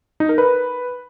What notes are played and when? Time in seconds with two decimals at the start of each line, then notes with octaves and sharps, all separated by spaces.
0.20 D#4
0.29 A#4
0.38 B4